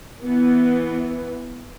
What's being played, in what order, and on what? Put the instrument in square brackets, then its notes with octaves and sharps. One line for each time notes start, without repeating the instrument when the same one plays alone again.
[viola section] E3 B3